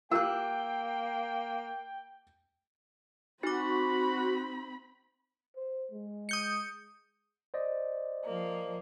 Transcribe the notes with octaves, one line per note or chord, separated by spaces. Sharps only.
A#3 F4 G4 G5 E6 F#6
C4 D#4 F#4 B5 D6
C5
G#3
D#6 G6 C#7
C5 D5 D#5
F3 A#3